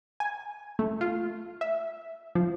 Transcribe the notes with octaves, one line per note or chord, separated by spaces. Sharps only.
G#5
A3
F4
E5
F3